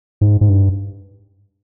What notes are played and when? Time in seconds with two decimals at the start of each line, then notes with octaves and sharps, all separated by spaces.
0.21 G#2
0.41 G#2
0.49 G2